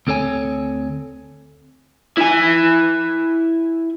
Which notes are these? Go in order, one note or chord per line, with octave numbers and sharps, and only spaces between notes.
D2 C4 A4 C#5 G#5
E4 G#5